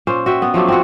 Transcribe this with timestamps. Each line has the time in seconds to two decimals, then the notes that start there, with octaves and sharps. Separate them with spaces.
0.07 A#2 C#4 C5
0.26 F#4 E5 G5
0.42 B3
0.54 F3 F#3 A3 D4
0.68 C4 F4 F#4